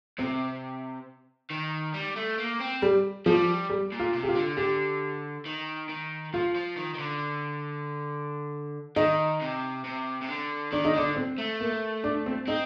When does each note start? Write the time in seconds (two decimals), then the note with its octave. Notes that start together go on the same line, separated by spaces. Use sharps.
0.18 C3 C4
1.50 D#3
1.94 G3
2.16 A3
2.38 A#3
2.60 C4
2.82 G3
3.26 F3 G3
3.70 G3
3.92 A#2
4.00 F4
4.13 C3
4.23 G4
4.28 F4
4.35 D3
4.57 D3 G4
5.46 D#3
5.89 D#3
6.34 F3 F4
6.55 F3
6.77 D#3
6.95 D#3
6.99 D3
8.96 D#3 D#4
9.41 C3
9.85 C3
10.22 C3
10.29 D3
10.72 D#3 D4
10.85 D#4
10.94 D3 D4
11.16 C4
11.38 A3
11.60 A#3
12.04 D4
12.26 C4
12.47 C4 D#4